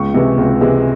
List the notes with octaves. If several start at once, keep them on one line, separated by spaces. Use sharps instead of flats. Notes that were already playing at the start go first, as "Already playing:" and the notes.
Already playing: C#2 C#6
C3 E3 G#3
C#2
C3 E3 G#3